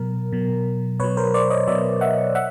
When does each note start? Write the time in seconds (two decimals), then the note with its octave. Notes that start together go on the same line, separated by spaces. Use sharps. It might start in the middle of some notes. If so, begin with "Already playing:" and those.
Already playing: B2 F#3 A#4
0.32 B2 F#3
1.00 B2 B4 C#5
1.04 F#3
1.17 A#4 C5
1.34 C5 D5
1.50 C#5 D#5
1.67 B2 F#3 D5 E5
2.01 E5 F#5
2.35 E5 F#5